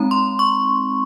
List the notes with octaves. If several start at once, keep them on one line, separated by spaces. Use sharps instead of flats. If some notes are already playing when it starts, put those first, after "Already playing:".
Already playing: G#3 C4 D#4 A#5
C6
C#6